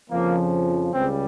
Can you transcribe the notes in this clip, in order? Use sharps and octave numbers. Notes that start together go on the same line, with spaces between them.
F2 C#3 F3 A#3
C#2 C#3 G3 C4